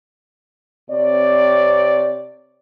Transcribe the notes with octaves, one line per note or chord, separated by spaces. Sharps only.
C3 C4 C#5 D5